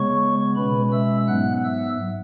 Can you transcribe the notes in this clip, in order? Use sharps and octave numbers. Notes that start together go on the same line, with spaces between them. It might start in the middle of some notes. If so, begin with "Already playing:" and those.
Already playing: C#3 G#3 B3 C#5 C#6
B2 G#3 C#4 B4 B5
E5 E6
G#2 F#3 B3 F#5 F#6
E5 E6